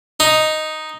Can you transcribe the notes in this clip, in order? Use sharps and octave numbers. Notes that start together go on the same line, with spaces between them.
D#4